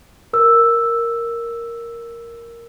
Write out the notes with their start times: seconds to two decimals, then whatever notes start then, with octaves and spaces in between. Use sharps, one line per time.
0.33 A#4 E6